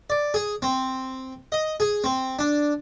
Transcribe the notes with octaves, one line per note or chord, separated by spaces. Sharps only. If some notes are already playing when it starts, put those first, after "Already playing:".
D5
G#4
C4
D#5
G#4
C4
D4